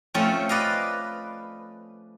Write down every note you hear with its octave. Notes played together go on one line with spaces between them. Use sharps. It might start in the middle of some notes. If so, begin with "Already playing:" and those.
F3 A3 C4 C#4
B4 D5 D#5 F5